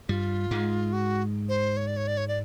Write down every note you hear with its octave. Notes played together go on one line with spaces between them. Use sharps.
G2 G3 F4
G#2 G#3
F#4
C5
C#5
D5
C#5
D5
C#5
D5